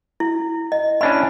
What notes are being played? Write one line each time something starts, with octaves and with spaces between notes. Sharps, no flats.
E4
D#5
C#4 D4 E4 B5